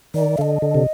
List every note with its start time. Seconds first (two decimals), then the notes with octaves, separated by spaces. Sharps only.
0.14 D#3 D5
0.38 D3 D#5 F5
0.62 D3
0.75 C3